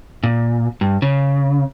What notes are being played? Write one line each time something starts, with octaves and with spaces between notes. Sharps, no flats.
A#2
G2
C#3